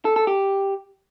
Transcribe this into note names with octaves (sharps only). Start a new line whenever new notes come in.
A4
A4
G4